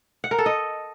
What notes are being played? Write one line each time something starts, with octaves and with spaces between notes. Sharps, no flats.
F#5
A#4
A4
D#5